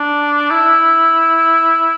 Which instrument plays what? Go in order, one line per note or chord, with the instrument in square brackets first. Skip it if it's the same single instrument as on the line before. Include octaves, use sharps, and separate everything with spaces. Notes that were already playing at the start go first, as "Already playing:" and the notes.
Already playing: [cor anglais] D4
E4